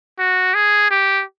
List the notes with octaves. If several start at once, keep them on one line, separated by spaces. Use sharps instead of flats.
F#4
G#4
G4